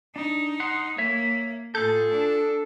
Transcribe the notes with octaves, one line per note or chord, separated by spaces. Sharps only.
D4 D#4
F#5 C6
A#3 C#5 E5
A2 F4 G#4 A4 G6
D4